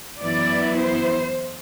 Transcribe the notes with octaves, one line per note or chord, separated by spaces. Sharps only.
F#2 E3 B3 E4 D5
C5